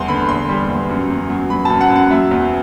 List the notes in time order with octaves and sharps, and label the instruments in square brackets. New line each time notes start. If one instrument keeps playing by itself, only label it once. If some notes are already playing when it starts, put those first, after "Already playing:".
Already playing: [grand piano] E2 G3 C6
D3 B5
E2 C6
G3
E2
F#2
F#2
F#3
F#3 B5
F#2 A5
F#5
F#2
F#5
F#3 E5
E2